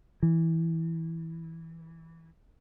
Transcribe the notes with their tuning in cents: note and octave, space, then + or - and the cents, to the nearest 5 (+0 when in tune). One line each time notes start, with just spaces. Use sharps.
E3 -10